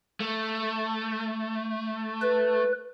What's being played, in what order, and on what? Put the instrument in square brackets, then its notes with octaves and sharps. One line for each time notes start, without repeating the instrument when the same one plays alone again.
[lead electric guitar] A3
[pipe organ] B4